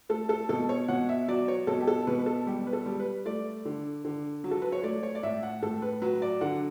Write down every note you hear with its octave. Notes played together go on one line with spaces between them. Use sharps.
A3 A4
A4
B2 A4
C#5
B2 F#5
E5
F#3 D5
C#5
B2 A4
G4
A4
B2 B4
B4
A4
G3 G4
B4
A4
G3
B4
A3 D5
D3
D3
F#3
A4
B4
C#5
A3 D5
C#5
D5
A2 E5
F#5
A2 A4
B4
F#3 B4
D5
D3 F#5